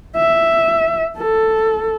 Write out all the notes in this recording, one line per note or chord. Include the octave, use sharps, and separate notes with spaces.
E5
A4